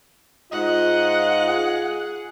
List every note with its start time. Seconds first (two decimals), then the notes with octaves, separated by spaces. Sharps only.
0.52 G#2 F4 D#5 F#5
1.48 G#4